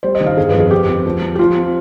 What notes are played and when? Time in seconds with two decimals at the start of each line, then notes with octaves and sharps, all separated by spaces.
0.03 G3 C5
0.15 D#5
0.21 D#3
0.26 F5
0.37 G1 G#4
0.49 F2 B4
0.60 G#4
0.71 C4 G4
0.88 C4
1.06 F3
1.22 F3
1.35 G4
1.39 F3 F4
1.56 C4